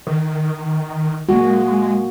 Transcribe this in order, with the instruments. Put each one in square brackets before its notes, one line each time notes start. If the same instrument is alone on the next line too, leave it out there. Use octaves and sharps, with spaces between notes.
[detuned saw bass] D#3
[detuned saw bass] G#3 [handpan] A#3 F#4